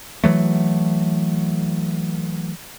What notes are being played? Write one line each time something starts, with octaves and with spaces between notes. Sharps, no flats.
E3 F#3 A3